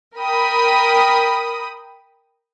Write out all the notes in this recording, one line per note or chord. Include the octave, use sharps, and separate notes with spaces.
A#4 G5 B5 D#6